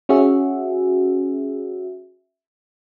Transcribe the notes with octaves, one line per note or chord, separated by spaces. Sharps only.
C#4 F#4 G#4 E5